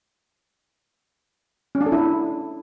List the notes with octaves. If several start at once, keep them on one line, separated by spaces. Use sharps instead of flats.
C#4
D4
A4
E4